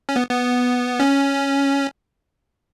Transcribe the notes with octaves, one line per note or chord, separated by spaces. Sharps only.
C#4
B3
B3
C#4